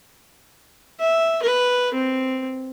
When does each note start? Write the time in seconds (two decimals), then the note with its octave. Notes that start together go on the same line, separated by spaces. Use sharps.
1.00 E5
1.43 B4
1.94 C4